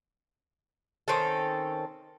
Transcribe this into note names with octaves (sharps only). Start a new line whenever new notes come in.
D#3 C4 C#4 A4